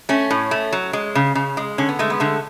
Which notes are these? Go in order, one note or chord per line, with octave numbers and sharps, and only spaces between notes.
A3 C#4
A2
A3
F#3
G#3
C#3
C#3
G#3
D3 C#4
B3
G#3 A3
B3
D3 A3